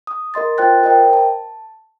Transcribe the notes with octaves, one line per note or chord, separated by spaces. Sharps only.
D#6
A#4 D#5 C6 A6
F4 C5 G5 F#6 A6
A#4 C5 D#5 G5
A5